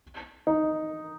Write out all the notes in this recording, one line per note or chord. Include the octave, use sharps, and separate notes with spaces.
D#4